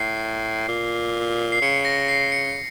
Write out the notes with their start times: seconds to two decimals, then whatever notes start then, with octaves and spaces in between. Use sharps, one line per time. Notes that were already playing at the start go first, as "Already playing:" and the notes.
Already playing: A2 C7
0.68 A#2
1.52 C7
1.62 C#3 C#7
1.85 A#6
2.08 C7
2.32 C#7